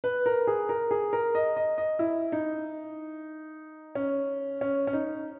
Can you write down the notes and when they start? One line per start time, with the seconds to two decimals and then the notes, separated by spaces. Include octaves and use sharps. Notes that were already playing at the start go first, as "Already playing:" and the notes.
0.04 B4
0.26 A#4
0.47 G#4
0.69 A#4
0.91 G#4
1.13 A#4
1.35 D#5
1.57 D#5
1.78 D#5
1.99 E4
2.32 D#4
3.95 C#4
4.61 C#4
4.87 C#4
4.93 D#4